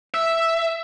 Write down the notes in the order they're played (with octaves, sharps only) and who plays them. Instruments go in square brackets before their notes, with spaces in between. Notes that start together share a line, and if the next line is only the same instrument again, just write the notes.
[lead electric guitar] E5